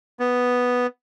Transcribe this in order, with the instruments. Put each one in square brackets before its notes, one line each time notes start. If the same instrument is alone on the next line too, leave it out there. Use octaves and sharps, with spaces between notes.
[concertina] B3